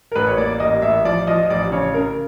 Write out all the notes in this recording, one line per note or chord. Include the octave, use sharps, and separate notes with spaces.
A#4
A1 B4
C#5
A#3 D5
A1 D#5
A1 E5
F3 D5
F3 D#5
D#5
A1 D5
C#3 C#5
C#3 A#4